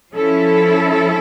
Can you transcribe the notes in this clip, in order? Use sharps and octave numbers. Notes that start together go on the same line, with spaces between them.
F3 C#4 E4 A4